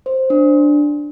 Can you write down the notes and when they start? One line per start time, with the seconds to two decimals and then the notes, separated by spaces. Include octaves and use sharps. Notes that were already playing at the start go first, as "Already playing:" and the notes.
0.06 C5
0.30 D4